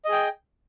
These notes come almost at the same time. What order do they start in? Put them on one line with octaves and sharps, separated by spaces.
D#5 G#4 G5